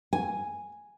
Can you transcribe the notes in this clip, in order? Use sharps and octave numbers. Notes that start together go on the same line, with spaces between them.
G#5